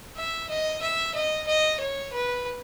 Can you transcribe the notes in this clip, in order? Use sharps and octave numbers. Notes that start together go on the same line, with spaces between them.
E5
D#5
E5
D#5
D#5
C#5
B4